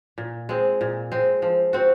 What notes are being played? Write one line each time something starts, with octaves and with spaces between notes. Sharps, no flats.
A#2
G#3 C4
A#2
G#3 C4
F3
C4 F#4